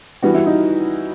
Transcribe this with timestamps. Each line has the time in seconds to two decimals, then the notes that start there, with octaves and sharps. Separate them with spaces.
0.23 E3 G3 B3 F#4
0.34 E4
0.46 D#4